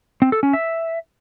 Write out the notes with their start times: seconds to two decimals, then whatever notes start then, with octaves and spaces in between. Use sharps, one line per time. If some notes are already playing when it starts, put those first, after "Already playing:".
0.22 C4
0.32 A4
0.43 C#4
0.53 E5